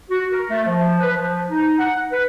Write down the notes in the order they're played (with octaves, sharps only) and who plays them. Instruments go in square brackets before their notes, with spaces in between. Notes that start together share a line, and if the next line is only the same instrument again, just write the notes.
[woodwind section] F#4
A#4
A3
F3
B4
F3
D#4
F#5
B4